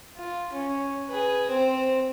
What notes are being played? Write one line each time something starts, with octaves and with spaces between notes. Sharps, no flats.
F4
C#4
G#4 B4
C4 C5